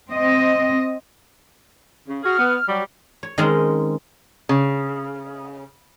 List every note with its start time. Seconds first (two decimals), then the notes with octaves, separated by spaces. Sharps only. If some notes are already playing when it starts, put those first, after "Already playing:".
0.10 C4 D#5
2.08 C#3
2.23 F#4 G#4 F6
2.38 B3
2.68 F#3 G3
3.23 C#5
3.38 D#3 G#3 C4 C#4 D#4
4.49 C#3